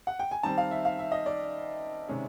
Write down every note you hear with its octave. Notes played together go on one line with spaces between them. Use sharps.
F#5
G5
G#5
D#3 G3 C4 A5
F5
E5
F5
E5
D#5
D5
C3 D#3 G#3 C#4